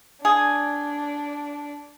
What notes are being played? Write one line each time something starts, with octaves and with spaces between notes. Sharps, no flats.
D4 G#4